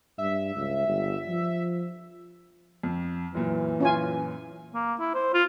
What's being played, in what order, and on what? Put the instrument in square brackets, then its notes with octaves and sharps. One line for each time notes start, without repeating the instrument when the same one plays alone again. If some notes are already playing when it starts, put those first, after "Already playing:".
[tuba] G2 [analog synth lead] E5
[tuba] C#2
G1
F3
[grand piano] F2
[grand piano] F#2 A#2 [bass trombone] E3
[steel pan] C#4 F4 G#5
[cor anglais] A#3
E4
C5
F4